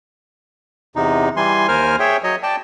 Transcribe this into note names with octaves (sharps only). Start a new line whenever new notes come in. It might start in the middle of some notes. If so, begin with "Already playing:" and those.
E2 C3 D#4
E3 G3 G#5 C6
D#2 A#4 C5 G#5 F6
G#4 C#5 E5 G5
F#3 C#5 D#5
D5 G5 A5